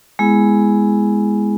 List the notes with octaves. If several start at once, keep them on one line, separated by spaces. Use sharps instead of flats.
G#3 B3 E4 G#4